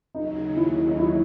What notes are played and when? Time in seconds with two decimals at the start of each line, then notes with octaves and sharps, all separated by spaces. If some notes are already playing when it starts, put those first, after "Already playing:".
0.14 D#2 C#3 F#3 D#4
0.56 E4
0.91 D#4
0.99 E4